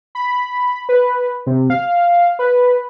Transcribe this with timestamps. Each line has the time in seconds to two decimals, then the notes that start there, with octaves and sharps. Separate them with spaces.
0.15 B5
0.89 B4
1.46 C3
1.70 F5
2.39 B4